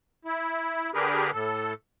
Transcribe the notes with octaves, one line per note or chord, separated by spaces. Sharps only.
E4
D3 D4 G4 G#4 A#4 B4
A2 A4